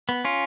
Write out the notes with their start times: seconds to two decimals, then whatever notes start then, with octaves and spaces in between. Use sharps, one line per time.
0.09 B3
0.25 C#4 F4